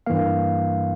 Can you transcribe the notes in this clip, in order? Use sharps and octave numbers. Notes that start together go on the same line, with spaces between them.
G2 E3 A#3 F5